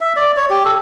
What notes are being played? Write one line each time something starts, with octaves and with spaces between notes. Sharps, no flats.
E5
D5
C#5
G4
A4